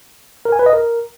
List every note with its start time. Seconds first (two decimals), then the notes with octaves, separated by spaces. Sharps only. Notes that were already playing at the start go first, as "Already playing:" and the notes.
0.45 A#4
0.52 G#5
0.59 B4
0.66 D#5
0.73 A#4